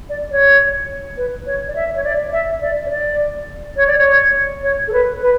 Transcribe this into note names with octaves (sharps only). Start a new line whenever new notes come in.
D5
C#5
B4
C#5
D5
E5
C#5
D5
E5
D5
C#5
D5
C#5
D5
C#5
C#5
A4
B4
B4